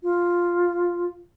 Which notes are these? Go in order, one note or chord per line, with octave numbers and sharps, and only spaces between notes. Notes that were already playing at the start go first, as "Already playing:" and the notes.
F4